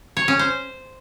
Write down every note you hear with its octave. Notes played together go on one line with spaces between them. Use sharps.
C#5
C#4
C5